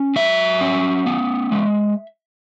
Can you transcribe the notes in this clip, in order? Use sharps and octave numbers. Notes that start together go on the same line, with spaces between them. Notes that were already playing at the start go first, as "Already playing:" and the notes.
Already playing: C#4
F#3 E5
C#4
B3
G#3